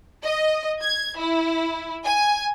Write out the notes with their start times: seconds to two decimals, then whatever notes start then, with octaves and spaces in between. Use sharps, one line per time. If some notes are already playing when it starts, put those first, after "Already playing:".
0.25 D#5
0.82 G#6
1.18 E4
2.06 G#5